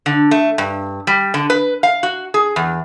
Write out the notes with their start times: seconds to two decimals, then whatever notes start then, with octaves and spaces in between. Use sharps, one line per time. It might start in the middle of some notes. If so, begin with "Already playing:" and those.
0.06 D3
0.31 A3
0.58 G2
1.07 G3
1.34 D3
1.50 B4
1.83 F5
2.03 F#4
2.34 G#4
2.56 E2